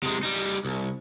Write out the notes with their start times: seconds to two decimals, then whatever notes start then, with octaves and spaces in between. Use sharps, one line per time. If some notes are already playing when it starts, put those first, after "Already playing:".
0.03 C3 G#3
0.23 G3 D#4
0.65 C2